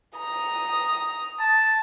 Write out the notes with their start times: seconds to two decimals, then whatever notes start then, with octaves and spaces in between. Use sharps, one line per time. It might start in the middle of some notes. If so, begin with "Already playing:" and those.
0.18 A#5 D#6
1.39 A5